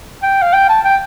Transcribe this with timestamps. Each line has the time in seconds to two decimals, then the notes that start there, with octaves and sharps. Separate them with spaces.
0.23 G5
0.42 F5
0.53 G5
0.69 A5
0.85 G5